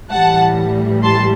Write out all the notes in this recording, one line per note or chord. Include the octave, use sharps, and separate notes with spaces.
A2 E3 G3 F#5 A5
A5 C6